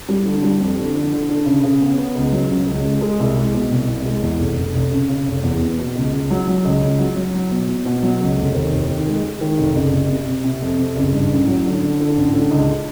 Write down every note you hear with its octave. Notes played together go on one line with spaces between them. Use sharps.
G3
D3
G3
F2
D3
D3
D3
D3
C#3
C#3
B3
B3
C#2
F#3
C#3
C#2
G#3
G#3
C2
G#3
B2
C2
C2
G#3
E2
F1
F1
F1
C#3
C#3
F1
E2
B3
B2
C#2
C#2
F#3
F#3
C#2
C#2
F#3
F#3
F#3
B2
B2
B2
F#3
C#2
F1
D#2
F1
D#3
G#3
G#3
D#3
F1
F#1
C3
C3
C3
C3
F2
C3
F#1
G2
A1
F#3
D3
D3
D3
A1
D3
C#2